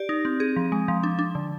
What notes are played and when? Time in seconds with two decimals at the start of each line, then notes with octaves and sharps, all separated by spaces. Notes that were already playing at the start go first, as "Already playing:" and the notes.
Already playing: G4 D5
0.09 D#4
0.25 C4
0.40 G#4
0.56 F3
0.72 G#3
0.88 F3
1.03 D4
1.19 D4
1.35 D3